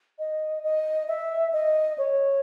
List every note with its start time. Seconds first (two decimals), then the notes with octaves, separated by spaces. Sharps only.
0.19 D#5
0.63 D#5
1.08 E5
1.53 D#5
1.98 C#5